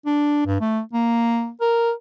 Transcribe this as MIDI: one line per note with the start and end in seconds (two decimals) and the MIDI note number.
0.06 0.45 62
0.46 0.59 43
0.61 0.81 57
0.93 1.50 58
1.61 1.92 70